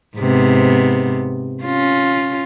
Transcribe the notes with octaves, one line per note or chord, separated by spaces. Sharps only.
G#2 C3 B3
C#4 F4